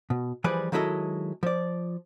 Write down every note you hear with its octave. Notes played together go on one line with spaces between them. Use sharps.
B2
E3 F3 G3 G#4 B4 D5
D#3 F#3 G#3 E4 A4 D#5
F3 D5